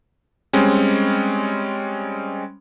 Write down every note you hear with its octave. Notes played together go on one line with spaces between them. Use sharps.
G3 G#3 C4 C#4